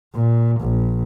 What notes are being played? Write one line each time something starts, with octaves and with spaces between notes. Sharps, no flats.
A#2
A#1